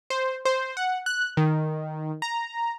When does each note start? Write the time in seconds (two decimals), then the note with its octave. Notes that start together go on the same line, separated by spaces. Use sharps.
0.10 C5
0.45 C5
0.77 F#5
1.06 F#6
1.37 D#3
2.22 A#5